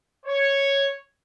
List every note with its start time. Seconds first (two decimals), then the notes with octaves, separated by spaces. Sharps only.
0.25 C#5